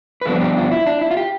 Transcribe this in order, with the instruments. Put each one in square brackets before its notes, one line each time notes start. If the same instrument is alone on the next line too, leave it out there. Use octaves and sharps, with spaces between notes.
[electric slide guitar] B4
G2 D3 F3 B3 D4 A4
G4
F4
E4
D4
E4
F4
G4